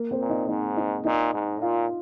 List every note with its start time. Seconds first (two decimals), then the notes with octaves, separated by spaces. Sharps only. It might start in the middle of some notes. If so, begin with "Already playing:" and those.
Already playing: A#3 A#4
0.11 C4 C5
0.21 A#2
0.29 D#4 D#5
0.48 G#2 D#4 D#5
0.77 D#4 D#5
1.05 A#2 D#4 D#5
1.34 G#2
1.61 A#2 F4 F5